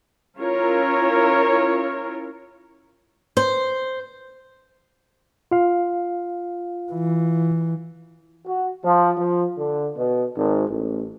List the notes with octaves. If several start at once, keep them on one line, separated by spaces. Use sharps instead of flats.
C#4 E4 F4 A#4 C#5
C5
F4 F5
E3
F#4
F3
F3
D3
B2
G#1
A1